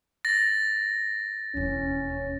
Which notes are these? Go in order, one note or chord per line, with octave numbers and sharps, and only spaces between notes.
A6 A#6
E1 D#2 C#4